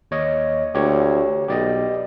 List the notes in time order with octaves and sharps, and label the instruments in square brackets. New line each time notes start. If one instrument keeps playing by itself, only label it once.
[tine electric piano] D#2 C#5 D#5
[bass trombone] D2 [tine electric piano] G4 C#5
[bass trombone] B1 [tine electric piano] G4 D5 D#5